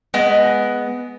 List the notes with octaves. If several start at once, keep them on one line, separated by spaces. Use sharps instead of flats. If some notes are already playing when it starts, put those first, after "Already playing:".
G#3 B3 D#5